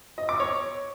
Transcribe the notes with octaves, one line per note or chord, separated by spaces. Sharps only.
D#5
D6
C#5